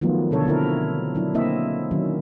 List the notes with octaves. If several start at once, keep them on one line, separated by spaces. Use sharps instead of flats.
D#3 F3 F#3 A3 B3 F4
B2 D3 D4 A4 C#5
D3 C4 E4 A#4
F#3 D4 E4
A#3 C4 E4 D#5 E5
D#3 F#3 C#4